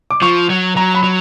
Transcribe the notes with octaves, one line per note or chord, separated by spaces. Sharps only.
D6
F3 C#6
F#3
F#3 A#5
B5
F#3